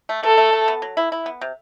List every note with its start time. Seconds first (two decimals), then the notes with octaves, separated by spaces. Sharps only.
0.09 A3
0.23 A3 A4
0.38 A3
0.53 A3
0.68 B3
0.82 F#3
0.97 E4
1.12 E4
1.26 B3
1.41 C3